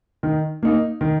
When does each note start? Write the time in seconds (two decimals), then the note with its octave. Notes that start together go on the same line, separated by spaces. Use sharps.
0.23 D#3
0.63 A#3 D#4
1.01 D#3